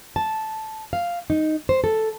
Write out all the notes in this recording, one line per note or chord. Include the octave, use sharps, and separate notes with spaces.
A5
F5
D#4
C5
A4